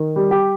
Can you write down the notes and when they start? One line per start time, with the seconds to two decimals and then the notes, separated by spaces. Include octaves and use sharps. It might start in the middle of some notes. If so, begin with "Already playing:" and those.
Already playing: D#3
0.16 G3
0.31 G4